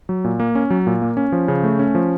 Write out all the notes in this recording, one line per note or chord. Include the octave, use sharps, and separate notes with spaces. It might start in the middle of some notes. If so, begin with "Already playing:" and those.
F#3
A#2
A#3
C#4
F#3
A#2
A#3
C#4
F3
C#3
A3
C#4
F3